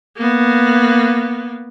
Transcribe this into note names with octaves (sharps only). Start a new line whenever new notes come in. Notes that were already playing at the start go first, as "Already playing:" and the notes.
A#3 B3